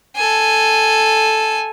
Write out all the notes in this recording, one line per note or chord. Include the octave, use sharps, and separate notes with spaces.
A4 G#5